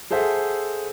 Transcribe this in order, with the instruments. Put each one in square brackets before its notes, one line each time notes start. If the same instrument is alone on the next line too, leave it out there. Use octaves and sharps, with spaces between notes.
[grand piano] G#4 A4 C5 E5 F#5